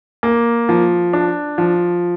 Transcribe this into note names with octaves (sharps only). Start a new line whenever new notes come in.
A#3
F3
D4
F3